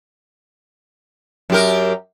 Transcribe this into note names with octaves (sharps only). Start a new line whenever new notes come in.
F#2 G4 A#4